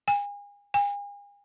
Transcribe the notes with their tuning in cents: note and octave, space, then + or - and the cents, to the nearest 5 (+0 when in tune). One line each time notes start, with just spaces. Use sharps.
G#5 -35
G#5 -40